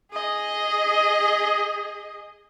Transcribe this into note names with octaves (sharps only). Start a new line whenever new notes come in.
G#4 D#5